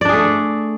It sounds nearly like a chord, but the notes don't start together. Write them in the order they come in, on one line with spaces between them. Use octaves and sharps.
D5 D4 G#4 A3